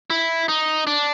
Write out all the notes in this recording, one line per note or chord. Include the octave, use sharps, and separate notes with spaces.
E4
D#4
D4